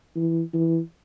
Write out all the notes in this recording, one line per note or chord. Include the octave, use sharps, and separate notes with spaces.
E3
E3